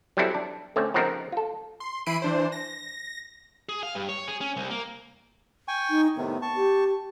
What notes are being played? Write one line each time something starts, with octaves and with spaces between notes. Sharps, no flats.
F#3 G3 B3 C4 E4 A4
D4
D3 A3 C4 C#4 C#5
C#3 F3 B3 C4 D#4 A#4
F4 A4
C6
E3 E4 B5 C7 D7 D#7
E3 D4 C5
A#6
G#4
F5
G2
C#5
G#4
C#4
C2
A#3
G5 G#5 C#6
D#4
A2 C3 D#3 B3
A5 C#6
G4